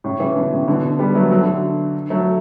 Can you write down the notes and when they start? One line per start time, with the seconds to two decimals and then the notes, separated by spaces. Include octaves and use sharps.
0.04 A2 C#3
0.20 C#3 E3
0.36 B2 D3
0.52 A2 C#3
0.68 B2 D3
0.99 G3 B3
1.15 F#3 A3
1.31 F#3 A3
1.41 D3 F#3
2.10 F#3 A3